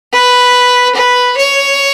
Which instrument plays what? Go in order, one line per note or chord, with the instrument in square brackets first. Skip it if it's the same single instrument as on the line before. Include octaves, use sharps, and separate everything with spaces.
[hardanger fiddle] B4
B4
C#5